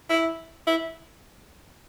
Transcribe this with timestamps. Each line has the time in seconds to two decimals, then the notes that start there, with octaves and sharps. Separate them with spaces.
0.10 E4
0.67 E4